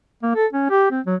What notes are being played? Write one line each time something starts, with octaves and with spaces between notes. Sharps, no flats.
A#3
A4
C#4
G4
C4
F#3